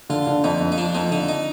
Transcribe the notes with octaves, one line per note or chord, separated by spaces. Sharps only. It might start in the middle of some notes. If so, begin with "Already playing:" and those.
D3 F4
D3
F2 D#4
F2
D#4
F3 D4
F2 D#4
D3 D#4
D#4